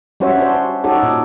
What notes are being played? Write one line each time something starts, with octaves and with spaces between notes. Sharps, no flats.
G3 C#4 F#4 C5 C#5 E5
D4 F#4 C5
D#4 F#4 G4 A4 C#5
A#2